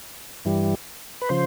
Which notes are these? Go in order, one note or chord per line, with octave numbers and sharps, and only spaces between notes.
G2 E3 G3
B4
C#3 F3 C5